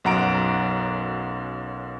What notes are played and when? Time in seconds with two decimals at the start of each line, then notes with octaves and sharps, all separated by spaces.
0.04 B1 F#2 F#5 A#5 D7